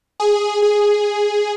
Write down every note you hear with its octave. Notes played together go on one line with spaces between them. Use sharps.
G#4
G#4